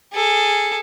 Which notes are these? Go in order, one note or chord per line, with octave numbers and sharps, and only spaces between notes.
G#4 A4